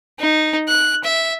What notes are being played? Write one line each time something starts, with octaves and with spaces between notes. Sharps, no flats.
D#4
F#6
E5